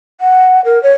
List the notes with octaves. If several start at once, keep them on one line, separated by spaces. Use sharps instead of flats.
F#5
A#4
C#5